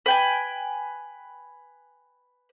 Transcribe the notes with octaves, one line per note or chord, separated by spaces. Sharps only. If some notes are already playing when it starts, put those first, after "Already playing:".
B4 G5 G#5